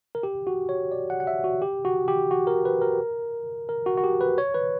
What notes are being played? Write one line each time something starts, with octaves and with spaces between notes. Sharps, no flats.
A#4
G4
F#4
C#5
D5
F#5
F#5
E5
F#4
G4
F#4
G4
F#4
A#4
B4
A#4
A#4
F#4
F#4
G4
B4
C#5
B4